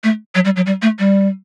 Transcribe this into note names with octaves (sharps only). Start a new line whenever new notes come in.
A3
F#3
G3
F#3
G3
A3
G3